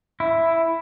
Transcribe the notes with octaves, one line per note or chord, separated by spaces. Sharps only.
E4